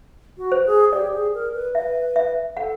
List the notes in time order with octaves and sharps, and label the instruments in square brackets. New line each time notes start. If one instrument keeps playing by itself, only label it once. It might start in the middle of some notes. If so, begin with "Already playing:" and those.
[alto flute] F#4
[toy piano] C5
[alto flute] G#4
[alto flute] G4 [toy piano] D5
[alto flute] G#4
A#4
B4
[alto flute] B4 [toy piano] E5
[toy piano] E5
[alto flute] A4 [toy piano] F#5